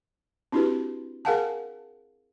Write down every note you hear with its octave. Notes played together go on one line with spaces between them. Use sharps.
C4 D4 E4 F#4 G4 B4
G#4 A#4 F5 F#5 G#5 A5